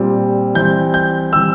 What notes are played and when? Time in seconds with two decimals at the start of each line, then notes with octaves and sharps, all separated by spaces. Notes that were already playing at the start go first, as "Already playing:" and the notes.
Already playing: A#2 G3 C4
0.55 E3 G3 C4 G6
0.94 G6
1.32 E3 G3 C4 E6